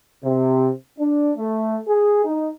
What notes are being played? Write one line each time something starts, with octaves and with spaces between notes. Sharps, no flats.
C3
D4
A3
G#4
D#4